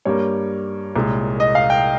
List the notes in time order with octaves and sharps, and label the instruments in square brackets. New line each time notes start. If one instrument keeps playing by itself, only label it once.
[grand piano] G2 G3 A#3 C#5
C2 A#2 G#3
D#5
F5
G5